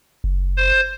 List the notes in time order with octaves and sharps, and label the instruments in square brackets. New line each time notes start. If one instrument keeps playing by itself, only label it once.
[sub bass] F#1
[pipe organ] C5